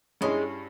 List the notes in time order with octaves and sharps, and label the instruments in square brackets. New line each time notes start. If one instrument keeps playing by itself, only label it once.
[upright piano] G2 G3 C#4 E4 G#4 [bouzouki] G#3